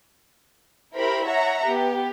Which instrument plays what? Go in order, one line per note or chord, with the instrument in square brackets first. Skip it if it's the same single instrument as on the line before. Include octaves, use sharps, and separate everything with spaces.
[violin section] E4 G4 A#4 C5 B5
C#5 E5 F#5 A#5
B3 G4